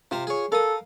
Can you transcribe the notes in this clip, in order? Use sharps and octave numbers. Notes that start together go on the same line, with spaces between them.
C3 F4 C5 A#5
G#4 C#5
A4 A#4 F5 D#6